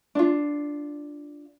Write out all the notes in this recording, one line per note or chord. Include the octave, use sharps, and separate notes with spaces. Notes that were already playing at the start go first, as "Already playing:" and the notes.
D4 F4